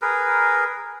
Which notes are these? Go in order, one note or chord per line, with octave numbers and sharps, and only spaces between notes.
G#4 A#4 B4